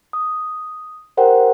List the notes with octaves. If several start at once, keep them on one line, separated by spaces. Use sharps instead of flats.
D#6
G4 A#4 C5 F#5 G5